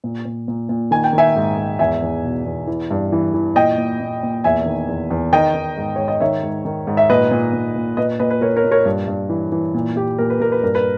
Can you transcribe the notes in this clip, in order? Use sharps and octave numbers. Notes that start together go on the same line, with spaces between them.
A#2
A#2
A#2
A#2
D#3 G#5
G5
D#3
E5 G#5
G#2
G#2
E2 E5 G#5
E2
B2
E2
E3
G2
E3
E3
A#2 D#5 G5
A#2
A#2
A#2
E2 E5 G#5
D#3
E2
E2
D#3 D#5 G5
D#3
G#2
G#2 C#5
D#5
D#3 C#5 E5
G#2
D#3
G#2
E5
A#2 B4 D#5
A#2
A#2
A#2
A#2 B4 D#5
A#2 B4 D#5
B4
A#2 A#4 C#5
A#4 C#5
A#2
A#4 C#5
G2
G2
E3
E3
A#2
A#2 G4
A#2 A#4
B4
A#2 A#4
B4
G2 A#4
B4